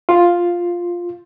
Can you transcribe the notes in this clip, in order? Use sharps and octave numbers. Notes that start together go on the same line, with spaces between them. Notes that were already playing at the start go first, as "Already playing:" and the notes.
F4